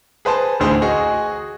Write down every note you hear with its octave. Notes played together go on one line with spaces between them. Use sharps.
G#4 B4 C5 A5
A1 D2 D3 G#4 C5
F#4 G#4 D#5